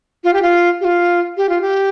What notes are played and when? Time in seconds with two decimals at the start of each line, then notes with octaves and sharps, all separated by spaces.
0.24 F4
0.34 G4
0.42 F4
0.81 G4
0.85 F4
1.37 G4
1.49 F4
1.61 G4